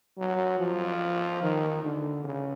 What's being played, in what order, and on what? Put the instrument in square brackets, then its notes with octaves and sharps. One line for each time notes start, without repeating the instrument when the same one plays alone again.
[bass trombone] F#3
F3
D#3
D3
C#3